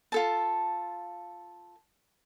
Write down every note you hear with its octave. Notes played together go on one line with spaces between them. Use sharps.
F4 A4 A5